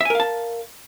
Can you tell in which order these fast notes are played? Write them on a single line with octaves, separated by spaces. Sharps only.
E5 G#5 A#4 F5 A5